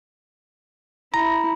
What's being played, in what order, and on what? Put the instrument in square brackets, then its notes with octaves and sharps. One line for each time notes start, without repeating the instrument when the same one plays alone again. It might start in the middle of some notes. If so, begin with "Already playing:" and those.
[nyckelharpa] E4 [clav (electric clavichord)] A#5